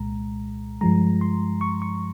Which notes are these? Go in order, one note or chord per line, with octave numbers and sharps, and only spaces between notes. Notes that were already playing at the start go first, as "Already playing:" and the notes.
Already playing: C2 A#2 G#3 A#5
G2 F3 G#3 A#5
C6
C#6
C#6